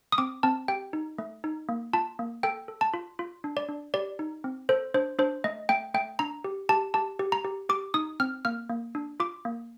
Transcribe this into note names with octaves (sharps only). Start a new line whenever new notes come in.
D#6
C4 D6
C4 A5
G4 G5
D#4
A3
D#4
A#3
F4 A5
A#3
A4 G5
A4
A5
F4
F4
D4
D5
D4
G4 D5
D#4
C4
A4 C5
D4 C5
D4 C5
A3 D#5
A3 G5
A3 G5
D4 A#5
G4
G4 A5
G4 A5
G4
A#5
G4
G4 D6
D#4 D#6
C4 F6
A#3 F6
A#3
D4
F4 D6
A#3